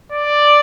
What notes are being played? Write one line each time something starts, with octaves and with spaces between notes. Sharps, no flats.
D5